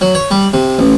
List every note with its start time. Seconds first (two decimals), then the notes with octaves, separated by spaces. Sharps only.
0.01 F#3
0.15 C#5
0.31 G3
0.54 C3
0.79 A1